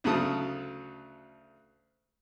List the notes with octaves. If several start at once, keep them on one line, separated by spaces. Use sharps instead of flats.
D2 C#3 F#3 A4 A5 D#6